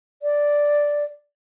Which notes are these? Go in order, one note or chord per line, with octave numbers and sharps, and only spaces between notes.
D5